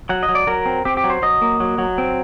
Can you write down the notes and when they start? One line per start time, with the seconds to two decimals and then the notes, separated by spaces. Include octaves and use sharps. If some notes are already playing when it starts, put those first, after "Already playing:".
0.09 F#3 F#5
0.23 D#5
0.29 F#3
0.35 D5
0.47 F#3 A#4
0.66 C4
0.85 C4 G4
0.97 G4
1.04 F#3
1.10 C5
1.22 F#3 D#5
1.42 A#3
1.60 F#3
1.78 F#3
1.98 C4